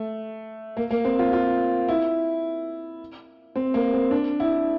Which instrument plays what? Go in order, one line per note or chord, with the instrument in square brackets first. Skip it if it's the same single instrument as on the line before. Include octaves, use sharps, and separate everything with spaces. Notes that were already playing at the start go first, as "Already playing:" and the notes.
Already playing: [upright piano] A3
A#3
A#3
C4
F4
F4
E4
C4
A#3
C4
D4
E4